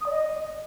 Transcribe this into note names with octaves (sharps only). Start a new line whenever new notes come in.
D#6
D5
D#5